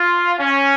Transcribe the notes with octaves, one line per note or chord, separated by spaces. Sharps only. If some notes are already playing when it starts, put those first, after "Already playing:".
Already playing: F4
C#4